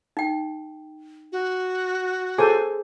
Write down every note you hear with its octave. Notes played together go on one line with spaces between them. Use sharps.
D#4 G5
F#4
G#4 A4 C5 G#5